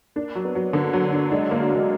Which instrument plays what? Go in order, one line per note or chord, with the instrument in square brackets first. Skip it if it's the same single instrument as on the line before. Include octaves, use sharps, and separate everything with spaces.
[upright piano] A#3 [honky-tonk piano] D4
[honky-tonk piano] F#3
[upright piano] B3
[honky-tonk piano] F#3
[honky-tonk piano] D3 [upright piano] A#3
[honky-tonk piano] F#3
D4
[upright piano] G#3 [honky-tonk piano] D4
[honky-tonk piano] A#3
[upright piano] F#3
[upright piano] G#3 [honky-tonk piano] A#3